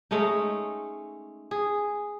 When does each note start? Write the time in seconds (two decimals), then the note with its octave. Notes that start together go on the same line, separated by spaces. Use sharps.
0.11 G#3 A3 C#4 D#4
1.51 G#4